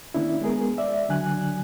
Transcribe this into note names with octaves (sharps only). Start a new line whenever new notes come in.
D#3 A#3 C#4 D4 E4
G#3 B3 G#4 A#4
D5 E5
D3 F#3 D4 G#5 F#6